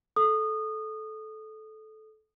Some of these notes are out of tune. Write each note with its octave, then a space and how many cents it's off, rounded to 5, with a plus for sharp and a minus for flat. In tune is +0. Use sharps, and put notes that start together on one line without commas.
A4 -15 D#6 -25